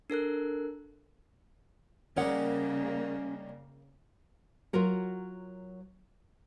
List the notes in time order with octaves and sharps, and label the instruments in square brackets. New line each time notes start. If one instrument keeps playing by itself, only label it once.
[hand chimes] D4 A4 A#4 F#6
[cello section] C#3 A#3 [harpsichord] G3 D#4 [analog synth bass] C#4 [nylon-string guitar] A#4 C#5 F#5
[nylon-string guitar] F#3 F4 F#4 A#4 C#5